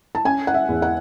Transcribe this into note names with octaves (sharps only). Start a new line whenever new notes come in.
A5
C#4 G#5
F#5
E5
E2
F#5